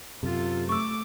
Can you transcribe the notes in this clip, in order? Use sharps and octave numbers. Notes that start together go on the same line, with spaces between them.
F#2 C3 F4 A4
A3 C#6 D6 E6